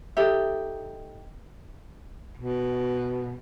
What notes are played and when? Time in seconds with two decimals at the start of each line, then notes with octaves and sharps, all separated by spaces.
0.16 D#4 G4 A4 E5
2.37 B2